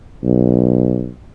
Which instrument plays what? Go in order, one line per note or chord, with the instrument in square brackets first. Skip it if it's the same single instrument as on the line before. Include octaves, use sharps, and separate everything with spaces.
[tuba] B1